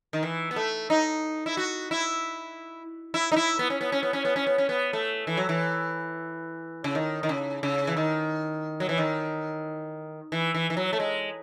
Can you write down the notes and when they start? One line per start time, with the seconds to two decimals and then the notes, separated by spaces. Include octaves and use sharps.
0.13 D#3
0.23 E3
0.51 B3
0.56 A3
0.90 D#4
1.46 E4
1.57 F#4
1.91 E4
3.14 E4
3.32 D#4
3.36 E4
3.59 B3
3.70 C#4
3.81 B3
3.92 C#4
4.03 B3
4.13 C#4
4.25 B3
4.36 C#4
4.47 B3
4.58 C#4
4.69 B3
4.93 A3
5.27 E3
5.37 F#3
5.49 E3
6.84 C#3
6.95 D#3
7.23 D#3
7.29 C#3
7.63 C#3
7.87 E3
7.97 D#3
8.80 F#3
8.89 E3
8.98 D#3
10.32 E3
10.55 E3
10.70 E3
10.77 F#3
10.93 A3
11.00 G#3